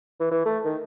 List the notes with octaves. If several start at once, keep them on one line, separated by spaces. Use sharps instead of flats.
E3
E3
A3
D#3